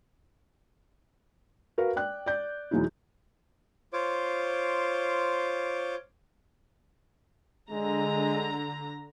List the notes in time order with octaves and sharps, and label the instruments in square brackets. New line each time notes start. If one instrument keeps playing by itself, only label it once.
[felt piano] F#4 A#4 B4 F5
D5 G5 F#6
D5 G6
E2 B2 F#3 G#3 D#4 E4
[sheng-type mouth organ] F4 C5 C#5 D6
[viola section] D3 A#5 [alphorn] G#3